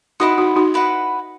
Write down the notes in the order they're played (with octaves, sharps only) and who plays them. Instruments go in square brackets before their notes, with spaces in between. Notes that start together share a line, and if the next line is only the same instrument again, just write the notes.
[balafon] D#4 F#4 [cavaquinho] E4 B4 D#5 F#5
[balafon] D#4 F#4
D#4 F#4
[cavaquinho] E4 B4 D#5 F#5